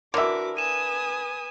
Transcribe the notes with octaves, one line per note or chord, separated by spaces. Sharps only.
D3 E3 F#4 A#4 B4 E5 D6
B4 G#5 D#6 D#7 E7